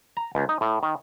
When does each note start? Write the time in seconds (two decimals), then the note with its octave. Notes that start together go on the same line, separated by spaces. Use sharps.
0.17 A#5
0.35 C#2
0.49 D#4
0.61 A2
0.83 D#3